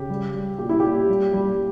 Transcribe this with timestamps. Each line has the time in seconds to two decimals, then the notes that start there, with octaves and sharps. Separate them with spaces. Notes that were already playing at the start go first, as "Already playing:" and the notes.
Already playing: C#3 G4
0.10 G3
0.34 G3
0.59 A#2 G4
0.69 E4
0.80 A#2 G4
1.09 G3
1.33 G3